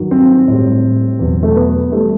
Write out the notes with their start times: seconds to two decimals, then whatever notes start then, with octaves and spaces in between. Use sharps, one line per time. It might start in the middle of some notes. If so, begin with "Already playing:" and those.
Already playing: G2 D#3 F#3
0.11 C4
0.48 A2 G3
1.19 E2 B2 F#3
1.43 A3
1.56 B3
1.91 E3 G3 A3